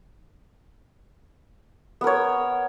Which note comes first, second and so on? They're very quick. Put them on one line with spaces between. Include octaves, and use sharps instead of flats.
B3 A#4 C#5